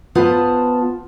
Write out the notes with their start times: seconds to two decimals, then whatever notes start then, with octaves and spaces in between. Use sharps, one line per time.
0.15 B3 F4 B4 C5 A5